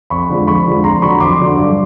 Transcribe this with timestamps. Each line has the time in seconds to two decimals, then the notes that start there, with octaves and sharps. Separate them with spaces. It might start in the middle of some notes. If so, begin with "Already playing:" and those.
0.10 F2 B5 C#6
0.29 D3 F3 G#3
0.47 F2 B5 C#6
0.66 D3 F3 G#3
0.84 F2 A#5 C6
1.02 D3 F#3 B5 C#6
1.20 F2 C6 D6
1.39 D3 F#3
1.57 G2